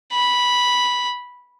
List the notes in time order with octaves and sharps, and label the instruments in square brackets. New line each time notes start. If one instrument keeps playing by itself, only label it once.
[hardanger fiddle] B5